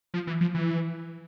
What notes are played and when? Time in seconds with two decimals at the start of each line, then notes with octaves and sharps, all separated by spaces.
0.14 F3
0.27 E3
0.41 F3
0.55 E3